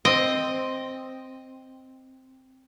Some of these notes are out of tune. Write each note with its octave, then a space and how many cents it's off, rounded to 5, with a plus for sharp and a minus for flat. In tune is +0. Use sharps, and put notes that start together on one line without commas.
C4 +0 D#5 +0